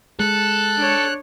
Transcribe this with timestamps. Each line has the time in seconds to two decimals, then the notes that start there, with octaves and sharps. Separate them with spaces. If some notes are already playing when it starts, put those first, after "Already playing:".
0.20 G#3 A4 F#6
0.77 D4 C#5